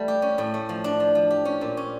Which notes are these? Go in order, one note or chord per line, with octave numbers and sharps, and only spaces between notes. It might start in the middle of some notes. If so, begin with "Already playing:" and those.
Already playing: E3 G3 A3
G4
C#4
A2
A3
F3
D4
F3
F3
G4
C#4
A#2
C#4